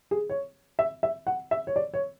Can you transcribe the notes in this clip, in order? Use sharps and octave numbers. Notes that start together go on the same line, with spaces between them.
G#4
C#5
E5
E5
F#5
E5
C#5
D5
C#5